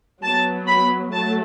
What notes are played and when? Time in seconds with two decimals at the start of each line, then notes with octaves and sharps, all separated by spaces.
0.23 F#3 B3 A5
0.67 B5
1.12 F#3 A3 A5